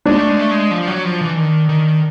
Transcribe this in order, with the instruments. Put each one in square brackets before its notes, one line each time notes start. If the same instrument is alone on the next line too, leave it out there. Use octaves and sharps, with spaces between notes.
[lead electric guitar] G#3 [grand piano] D4
[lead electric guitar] A3
G#3
A3
G#3
F3
F#3
F3
E3
D#3
D#3